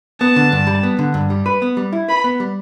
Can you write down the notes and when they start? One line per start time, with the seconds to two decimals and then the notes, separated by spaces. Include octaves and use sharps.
0.20 B3 A5
0.36 D3
0.52 G2
0.67 G3
0.83 B3
0.99 D3
1.14 G2
1.30 G3
1.46 B4
1.62 B3
1.77 G3
1.93 E4
2.08 B4 B5
2.24 B3
2.40 G3